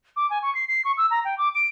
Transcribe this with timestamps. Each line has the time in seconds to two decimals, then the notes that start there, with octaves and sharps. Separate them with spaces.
0.16 D6
0.30 G#5
0.42 C#6
0.55 C7
0.68 C7
0.85 C#6
0.97 E6
1.11 A#5
1.25 G5
1.38 D6
1.55 D7